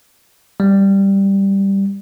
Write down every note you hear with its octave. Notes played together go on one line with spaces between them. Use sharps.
G3